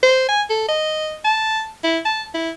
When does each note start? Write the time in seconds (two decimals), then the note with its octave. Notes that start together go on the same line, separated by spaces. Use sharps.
0.03 C5
0.29 G#5
0.50 A4
0.68 D#5
1.25 A5
1.84 E4
2.05 A5
2.34 E4